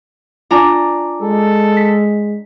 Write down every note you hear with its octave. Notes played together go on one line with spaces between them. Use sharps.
D4 F4 G#5 A#5 D6
G#3 A4
B6